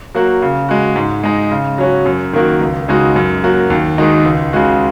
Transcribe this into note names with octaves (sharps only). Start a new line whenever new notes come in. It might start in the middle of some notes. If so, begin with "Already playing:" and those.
F#3 A#3 F#4
C#3
G#3 F#4
G#2
G#3 D#4
C#3
F#3 C#4 F#4
F#2
D#3 A#3 F#4
C#2
C#3 G#3 D#4 F#4
F#2
F#3 A#3 F#4
D#2
D#3 G#3 D#4 F#4
C#2
C#3 G#3 F#4